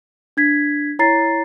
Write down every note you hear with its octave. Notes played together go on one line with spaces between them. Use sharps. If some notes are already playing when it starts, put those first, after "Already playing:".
D4 G#6 B6
E4 C#5 A#5 A6 C7